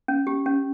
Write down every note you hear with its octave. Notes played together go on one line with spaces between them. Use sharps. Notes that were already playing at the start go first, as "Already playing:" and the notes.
C#4
G4
C#4